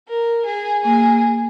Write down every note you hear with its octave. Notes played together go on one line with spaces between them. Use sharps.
A#4
G#4
A#3 G#4